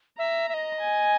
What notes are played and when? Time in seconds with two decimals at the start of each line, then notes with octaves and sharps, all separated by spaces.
0.19 E5 A#5
0.49 E5
0.54 D#5
0.79 G#5